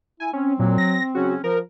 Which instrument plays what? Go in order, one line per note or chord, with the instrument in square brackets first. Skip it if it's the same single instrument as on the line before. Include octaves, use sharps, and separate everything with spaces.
[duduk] E4 [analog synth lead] G#5
[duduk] C4 [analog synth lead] C#4
[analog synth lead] A#2 [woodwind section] F#3
[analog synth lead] A#6
[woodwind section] C#3 F#3 C#4 [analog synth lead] F#4
[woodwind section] F3 [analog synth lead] A#4